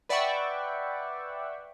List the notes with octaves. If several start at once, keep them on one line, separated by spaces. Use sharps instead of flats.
B4 D5 E5 F#5 G5 C#6